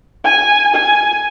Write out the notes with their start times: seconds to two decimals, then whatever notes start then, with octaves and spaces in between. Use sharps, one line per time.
0.25 G#5
0.75 G#5